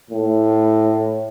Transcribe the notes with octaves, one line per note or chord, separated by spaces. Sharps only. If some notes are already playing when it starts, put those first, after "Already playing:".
A2